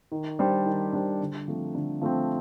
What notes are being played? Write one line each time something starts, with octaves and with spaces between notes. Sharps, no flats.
D#3
G3 D4 G4 C5
D#3
G3 D4 G4 C5
D3
F3 A3 C4
D3
F3 A3 C4